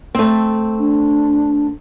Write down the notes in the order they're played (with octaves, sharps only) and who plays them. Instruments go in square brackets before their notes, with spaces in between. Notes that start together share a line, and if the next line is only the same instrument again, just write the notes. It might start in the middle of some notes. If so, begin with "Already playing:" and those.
[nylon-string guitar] A3 C4
[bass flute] D4